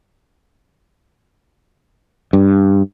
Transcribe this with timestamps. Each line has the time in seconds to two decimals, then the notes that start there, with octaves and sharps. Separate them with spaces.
2.33 G2